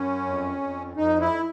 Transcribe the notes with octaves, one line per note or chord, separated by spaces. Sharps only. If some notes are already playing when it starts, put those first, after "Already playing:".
Already playing: F#2 C#4
F2
F2
F2 D#4
E4